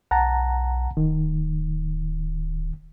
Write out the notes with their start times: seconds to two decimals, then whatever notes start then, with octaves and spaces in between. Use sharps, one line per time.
0.11 B1 F#5 A5 A#5
0.97 D1 D#3